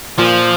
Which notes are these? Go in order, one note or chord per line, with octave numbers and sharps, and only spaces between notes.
A#2 F3